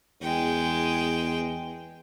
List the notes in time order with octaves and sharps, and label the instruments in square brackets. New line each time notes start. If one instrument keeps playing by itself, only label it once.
[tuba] E2 [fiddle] G#3 G5